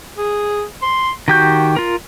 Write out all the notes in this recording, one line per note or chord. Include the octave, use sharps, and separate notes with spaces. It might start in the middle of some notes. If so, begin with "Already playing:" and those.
G#4
C6
D#3 F#4 G4 G6
F4 A#4